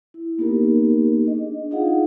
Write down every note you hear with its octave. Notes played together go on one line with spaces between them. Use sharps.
E4
A#3 B3 D#4 G4 A#4
D4 G#4 D#5
D#4 F4 G#4 F5 F#5